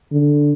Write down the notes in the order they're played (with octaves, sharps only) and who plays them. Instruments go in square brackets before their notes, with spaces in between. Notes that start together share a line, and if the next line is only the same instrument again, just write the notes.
[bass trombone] D3